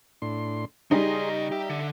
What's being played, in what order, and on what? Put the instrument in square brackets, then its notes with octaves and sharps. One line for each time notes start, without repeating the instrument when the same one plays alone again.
[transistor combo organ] A2 D4 C6
[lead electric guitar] C#3 D#5 [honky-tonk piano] G3 D#4 [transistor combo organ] G#4 C6
[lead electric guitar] G4 [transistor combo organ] E5
[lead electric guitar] D3